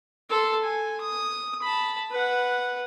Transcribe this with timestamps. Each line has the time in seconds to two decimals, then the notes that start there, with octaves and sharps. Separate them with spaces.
0.30 A4 C6
0.64 G#5
1.01 D#6
1.62 A5 B5
2.11 B4 F#5